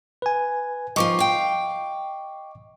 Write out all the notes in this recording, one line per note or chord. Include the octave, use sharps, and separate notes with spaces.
B4 G#5
D#3 F3 F4 D#5 C#6 D6
F5 G5